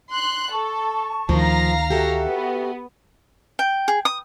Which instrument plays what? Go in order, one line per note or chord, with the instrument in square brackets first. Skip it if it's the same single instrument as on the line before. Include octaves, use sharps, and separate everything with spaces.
[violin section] C6 F#6
[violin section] A4 [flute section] A5 C#6
[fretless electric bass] D2 D#3 [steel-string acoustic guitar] F3 [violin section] F5 A#5 A#6
[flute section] F#4 E5 [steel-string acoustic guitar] G4 A4
[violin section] B3
[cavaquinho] G5
G#4
D#6